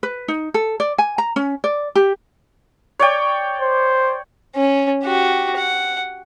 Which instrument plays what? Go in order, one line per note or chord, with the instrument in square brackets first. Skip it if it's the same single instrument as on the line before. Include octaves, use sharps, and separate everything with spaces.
[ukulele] B4
D#4
A4
D5
G#5
A#5
C#4
D5
G4
[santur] C#5 D5 G5
[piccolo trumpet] C5
[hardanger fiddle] C#4
F#4 G4
F#5